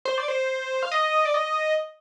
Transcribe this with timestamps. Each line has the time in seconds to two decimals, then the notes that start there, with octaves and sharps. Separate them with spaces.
0.05 C5
0.18 D5
0.28 C5
0.83 F5
0.92 D#5
1.25 D5
1.34 D#5